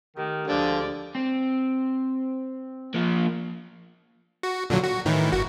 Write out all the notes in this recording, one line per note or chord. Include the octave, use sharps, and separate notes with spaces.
D#3 A3 G4 A#4
D2 D3 F3 G#3 D5 D7
C4
F3 A#3
F#4
A#2 D3 F#3
F#4
A2 D#3 E3
G1 F#4